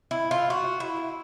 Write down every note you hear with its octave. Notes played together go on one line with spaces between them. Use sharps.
E4
F4
F#4
E4